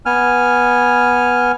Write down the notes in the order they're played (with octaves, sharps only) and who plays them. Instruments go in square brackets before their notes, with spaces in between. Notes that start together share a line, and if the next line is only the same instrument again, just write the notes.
[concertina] B3 G#5 F6